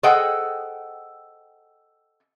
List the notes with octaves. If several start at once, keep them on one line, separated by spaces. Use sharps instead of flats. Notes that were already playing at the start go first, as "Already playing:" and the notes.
G#4 A4 C5 D#5 F#5 G5